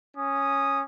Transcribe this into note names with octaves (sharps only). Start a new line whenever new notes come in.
C#4 D#6